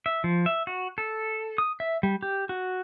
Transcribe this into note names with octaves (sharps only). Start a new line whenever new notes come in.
E5
F3
E5
F#4
A4
D#6
E5
G3
G4
F#4